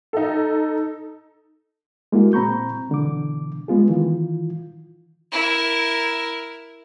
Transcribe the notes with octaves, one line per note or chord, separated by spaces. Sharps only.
D#4 A4
G#3 A#3 E4 F#4 G#4
A#2 C4 A#5 B5 C#6 G6
B2 D3 E3 D6
G#3 B3 F4 G#4
D#3 E3 F4
E4 A#4